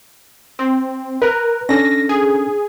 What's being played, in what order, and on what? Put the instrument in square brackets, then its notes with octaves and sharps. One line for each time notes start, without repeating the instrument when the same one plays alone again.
[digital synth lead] C4
[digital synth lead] A#4 [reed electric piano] B4 F#6
[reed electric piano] C#4 D4 A4 [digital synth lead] A#6
[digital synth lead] G#4